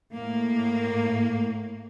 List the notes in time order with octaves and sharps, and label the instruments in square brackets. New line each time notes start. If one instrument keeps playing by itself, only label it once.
[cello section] A2 A#3